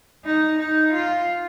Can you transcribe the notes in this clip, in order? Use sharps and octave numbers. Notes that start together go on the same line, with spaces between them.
D#4
D#4
F4